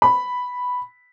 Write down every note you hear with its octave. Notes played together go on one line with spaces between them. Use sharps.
B5